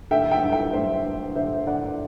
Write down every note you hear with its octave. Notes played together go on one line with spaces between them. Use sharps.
D3 E5 G5
E5 G5
G2
E5 G5
G2 C5 E5
G2
D3 C5 E5
D3 D5 F#5